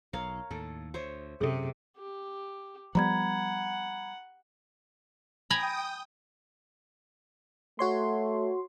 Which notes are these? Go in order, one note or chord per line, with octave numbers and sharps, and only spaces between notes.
B1 A#4 C#5 F5
D#2 A2 A4
D2 C5 C#5 E5
F#2 C3 F3 C#4 G#4 A4
G4
F3 G3 B3 F#5 A#5 B5 G#6
G5 G#5 A#5 B5 D#6
A3 F#4 C#5 C6